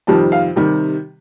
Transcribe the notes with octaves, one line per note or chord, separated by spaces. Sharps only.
F2 C3 D#3 G3 A5
F5
C3 D#3 G3